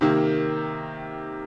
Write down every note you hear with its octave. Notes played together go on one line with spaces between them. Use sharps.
C3 D#3 A#3